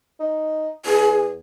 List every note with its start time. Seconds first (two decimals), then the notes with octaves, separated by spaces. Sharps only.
0.20 D#4
0.85 E2 G#4